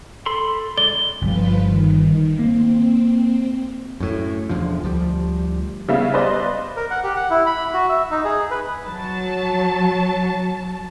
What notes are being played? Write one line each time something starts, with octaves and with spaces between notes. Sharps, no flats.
A4 B5 C6
D3 G#3 D5 G7
G1 F3 G3 F4 B4
D#3
A#3 C4
F#2 A2
E1 E2 D3 F3
D2 F3 G3
C#3 G3 B3 E5 F5
B4 C5 D5 D#5
A#4
F#5
G4
F#5
E4
B5
F#4
E5
D#4
G#4
B4
F#3 A5